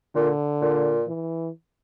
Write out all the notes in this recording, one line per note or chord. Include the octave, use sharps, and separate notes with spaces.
A#2 D3
A#2
E3